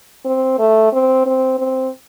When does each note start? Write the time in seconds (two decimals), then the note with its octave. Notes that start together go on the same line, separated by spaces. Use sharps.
0.25 C4
0.59 A3
0.93 C4
1.26 C4
1.59 C4